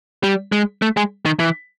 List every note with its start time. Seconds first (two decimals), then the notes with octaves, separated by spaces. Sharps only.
0.23 G3
0.52 G#3
0.82 A3
0.97 G#3
1.25 D#3
1.39 E3